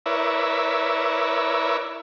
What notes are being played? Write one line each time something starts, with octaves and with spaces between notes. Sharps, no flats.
E4 A#4 B4 C#5 D5 E5